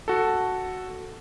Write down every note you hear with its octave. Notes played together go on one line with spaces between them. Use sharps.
F#4 A4